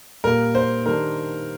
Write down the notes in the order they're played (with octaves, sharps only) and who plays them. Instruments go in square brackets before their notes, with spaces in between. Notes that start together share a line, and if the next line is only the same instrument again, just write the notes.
[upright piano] A#2 G3 A#3 [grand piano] A#4
[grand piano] C5
[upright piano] D#3 G3 D4 [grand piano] A#4